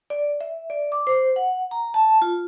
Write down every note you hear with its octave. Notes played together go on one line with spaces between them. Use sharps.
D5
E5
D5
D6
C5
F#5
A#5
A5
F4